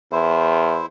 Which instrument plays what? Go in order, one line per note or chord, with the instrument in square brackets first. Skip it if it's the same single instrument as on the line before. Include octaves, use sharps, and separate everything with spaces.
[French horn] E2 [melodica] E4 C5